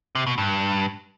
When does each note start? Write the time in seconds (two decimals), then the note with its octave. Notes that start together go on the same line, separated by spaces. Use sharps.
0.15 C3
0.27 B2
0.38 G2